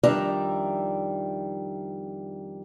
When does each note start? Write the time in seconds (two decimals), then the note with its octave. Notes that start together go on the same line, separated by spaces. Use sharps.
0.03 F2 D#3 G3 D4 E5 A#5